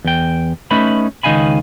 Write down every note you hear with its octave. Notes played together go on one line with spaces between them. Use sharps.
E2 G5
A3 C#4 D#4 B4 B5
C#2 D#3 D#4 F5 G#5 B5